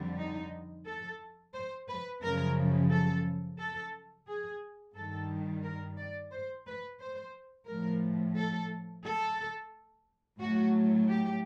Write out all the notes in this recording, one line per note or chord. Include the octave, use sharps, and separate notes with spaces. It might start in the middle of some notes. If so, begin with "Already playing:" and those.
Already playing: F2 D3 G3
D#4
A4
C5
B4
F#2 C#3 F3 A#4
A4
A4
G#4
G2 D#3 G3 A4
A#4
D5
C5
B4
C5
A2 F3 A#4
A4
A4
A2 F#3 F#4
G4